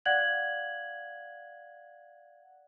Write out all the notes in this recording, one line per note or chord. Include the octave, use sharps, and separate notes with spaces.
D5 F5 F#5 F#6 G#6 F#7